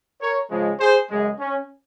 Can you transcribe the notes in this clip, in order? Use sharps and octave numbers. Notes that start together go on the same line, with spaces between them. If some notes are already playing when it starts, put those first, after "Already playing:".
A#4 C#5
C#3 F3 G#3
G#4 C5
F#2 C#3 G#3
C#4